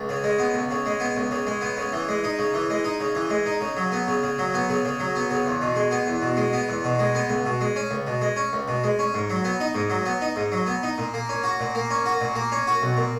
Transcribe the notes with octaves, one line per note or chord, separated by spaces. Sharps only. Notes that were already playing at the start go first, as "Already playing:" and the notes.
Already playing: C#2
C#3
G#3
B3
C#2
C#3
G#3
B3
C#2
C#3
G#3
B3
C#3
E3
G#3
D#4
C#3
E3
G#3
D#4
C#3
E3
G#3
D#4
C#3
F#3
B3
C#3
C#3
F#3
B3
C#3
C#3
F#3
B3
C#3
E2
B2
G#3
B3
E2
B2
G#3
B3
E2
B2
G#3
B3
C#2
B2
G#3
C#4
C#2
B2
G#3
C#4
C#2
B2
G#3
C#4
G#2
F#3
B3
D#4
G#2
F#3
B3
D#4
G#2
F#3
B3
D#4
A#2
A#3
C#4
F#4
A#2
A#3
C#4
F#4
A#2
A#3
C#4
F#4
B1
A#2